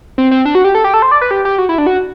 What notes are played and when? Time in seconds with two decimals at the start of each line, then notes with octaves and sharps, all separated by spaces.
0.18 C4
0.31 C4
0.46 D4
0.55 F#4
0.64 G4
0.75 A4
0.84 G4
0.94 A4
1.02 C5
1.11 D5
1.21 B4
1.31 G4
1.45 G4
1.58 F#4
1.69 E4
1.78 D4
1.87 F#4